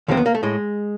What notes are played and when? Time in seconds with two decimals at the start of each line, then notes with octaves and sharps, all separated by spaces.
0.08 D#2 D3 F3 G#3 C4
0.17 B3
0.26 A#3
0.35 A3
0.43 A2 G#3